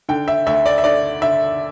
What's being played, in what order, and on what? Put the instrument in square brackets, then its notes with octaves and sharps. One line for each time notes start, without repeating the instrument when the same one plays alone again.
[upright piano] D3 G5
E5
D2 E5
D5
E5
D3 D5
D3 E5